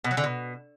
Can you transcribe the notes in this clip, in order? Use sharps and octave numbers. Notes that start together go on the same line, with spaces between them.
B2
F#3
D3
B2